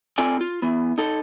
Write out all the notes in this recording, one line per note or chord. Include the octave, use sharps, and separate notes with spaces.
C4 F4 A4 D5 G#5
F4
E3 B3
D#4 A4